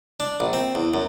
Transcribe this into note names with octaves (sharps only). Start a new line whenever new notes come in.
D4
A#1
C4
E2
F#2